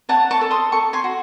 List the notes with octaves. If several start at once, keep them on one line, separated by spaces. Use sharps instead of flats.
C#5 F#5 A5
A5 C#6
A4
C6 D#6
A4 A5 C#6
G#5 C6
F#4